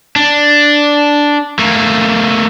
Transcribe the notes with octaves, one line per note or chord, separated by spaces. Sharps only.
D4
A3 A#3